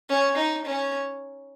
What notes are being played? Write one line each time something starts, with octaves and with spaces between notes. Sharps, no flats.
C#4
D#4
C#4